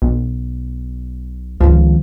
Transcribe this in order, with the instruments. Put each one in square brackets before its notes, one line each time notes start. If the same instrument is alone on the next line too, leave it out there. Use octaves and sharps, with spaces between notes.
[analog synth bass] B1
[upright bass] C#2 D#3 [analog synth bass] F3